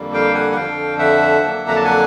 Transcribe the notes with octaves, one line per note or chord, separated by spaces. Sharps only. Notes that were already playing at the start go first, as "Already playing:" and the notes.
Already playing: F2 D3 G3 A#3
F5 G5
F#5 G#5
F#5
F2 D3 F3 F5 G5
E5 F#5
F2 D3 F#3 A#3 D4
A#5
A5
F#5 G#5